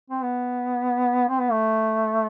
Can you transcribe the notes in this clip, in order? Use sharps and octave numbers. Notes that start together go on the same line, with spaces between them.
C4
B3
C4
B3
A3